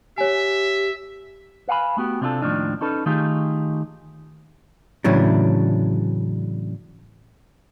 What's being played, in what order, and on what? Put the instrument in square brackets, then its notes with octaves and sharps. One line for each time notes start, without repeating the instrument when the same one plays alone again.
[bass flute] G4 [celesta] C#5 G#5 [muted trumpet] E5
[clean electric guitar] B4 F5 F#5 G#5 B5
A3 B3 F#4 G4
C3 C4 D4 E4 F4 A4
D#2 A2 F3 D4 D#4
C#4 D#4 A4 B4
D#3 A3 D#4 F4 G4 G#4
[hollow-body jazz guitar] A2 C#3 E3 F#3 D4